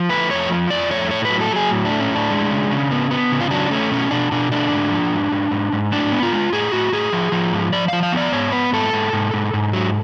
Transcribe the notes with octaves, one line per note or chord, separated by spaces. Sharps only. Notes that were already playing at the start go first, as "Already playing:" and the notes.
Already playing: F3
A3 B4
F2 C#5
F3
F2 D5
A3 C#5
A2 C#5
F#3 B4
A4
F#3 G#4
A2
D4
A3
C#4
A2 D4
G#3
C#3
C#3
B3
B3
C#3
F4
F#3 D4
A3 C#4
B2 C#4
B2 D4
B2 D4
A3 D4
G#2
F3
G#2
G#2
G#2
G#2
A2 D4
B3
F4
G#3
A2 G#4
A2 F#4
A2 G#4
F3
F3
G#2
F3 D5
F3 F5
F5
B3 D5
G#2 C#5
B3 B4
G#2 A4
G#2
G#2
G#2
G#2
F#3